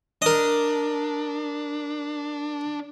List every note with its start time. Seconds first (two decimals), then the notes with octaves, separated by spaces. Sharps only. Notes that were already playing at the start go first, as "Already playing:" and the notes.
0.22 D4 A#4 D#5